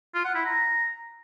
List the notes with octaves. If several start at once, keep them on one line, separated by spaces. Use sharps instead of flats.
F4
F#5
E4
A#5